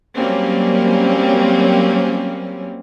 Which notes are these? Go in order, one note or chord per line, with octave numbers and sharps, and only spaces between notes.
F#3 G3 A#3 C4 C#4